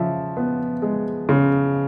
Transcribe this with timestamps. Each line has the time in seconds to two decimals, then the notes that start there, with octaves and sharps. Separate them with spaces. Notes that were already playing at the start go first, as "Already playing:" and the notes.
Already playing: C#3 F3 E5
0.37 B3
0.82 G#3
1.29 C#3